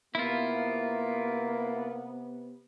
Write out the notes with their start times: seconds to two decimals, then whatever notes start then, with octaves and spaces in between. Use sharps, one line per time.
0.15 C3 A#3 B3 E4 F4